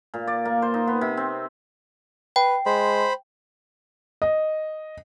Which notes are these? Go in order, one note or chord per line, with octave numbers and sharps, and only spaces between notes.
A#2
D5
A#3
C5
D#4
B3
C3
C4
B4 G5
G#3 C5 B5
D#5